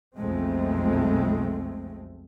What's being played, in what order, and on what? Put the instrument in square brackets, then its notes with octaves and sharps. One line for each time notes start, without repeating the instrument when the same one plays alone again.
[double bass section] B1 F2 G#3 A3 C4